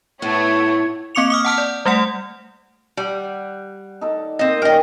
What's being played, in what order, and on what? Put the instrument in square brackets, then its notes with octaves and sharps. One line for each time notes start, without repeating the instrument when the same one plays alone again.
[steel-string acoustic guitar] A2 [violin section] A3 B3 [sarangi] C#5
[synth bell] A#3 C4 C#6 D6 C#7 F7
D6 D#6 F6
F#5 A5 F6
D5
G3 A3 D5 F#5
[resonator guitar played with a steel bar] G3 [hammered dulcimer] F#5
[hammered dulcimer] D#4 A4 D5
[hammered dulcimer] A#3 [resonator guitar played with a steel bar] C4 D#5
[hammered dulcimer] D#3 C#4 G4 [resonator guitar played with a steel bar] A#4 D#5